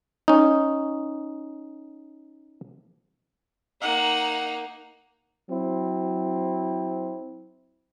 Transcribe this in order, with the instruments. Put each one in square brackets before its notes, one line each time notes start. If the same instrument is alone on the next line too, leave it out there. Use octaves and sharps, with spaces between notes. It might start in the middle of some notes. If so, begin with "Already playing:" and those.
[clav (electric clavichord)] C#4 D#4
[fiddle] A#3 D#4 [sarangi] F#5
[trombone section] F#3 C4 E4